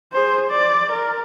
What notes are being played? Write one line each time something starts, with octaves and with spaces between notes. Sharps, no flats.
G#4 C5
D5
A#4